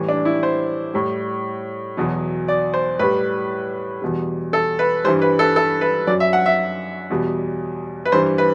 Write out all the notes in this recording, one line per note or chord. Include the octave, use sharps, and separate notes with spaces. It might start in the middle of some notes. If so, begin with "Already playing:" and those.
Already playing: A2 E3 G3
D4
E4
C5
A2 G3
E2 B2 F#3
D5
C5
A2 G3 B4
E2 B2 G3
A4
B4
G2 E3 G3 C5
B4
A4
A4
B4
F#2 F#3 D5
E5
F#5
E5
E2 B2 G3
B4
G2 E3 G3 C5
B4